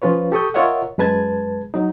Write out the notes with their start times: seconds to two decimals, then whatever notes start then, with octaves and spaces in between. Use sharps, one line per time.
0.02 F3 C#4 F4 B4 C#5
0.32 G4 A4 C#6 D#6 G6
0.54 F4 A#4 C#5 D#5 E5 F#5
0.98 F#2 G#3 B4 A5 G#6
1.74 F#3 D#4